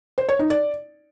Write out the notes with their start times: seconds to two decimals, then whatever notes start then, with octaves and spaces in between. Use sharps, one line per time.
0.18 C5
0.29 C#5
0.39 D#4
0.50 D5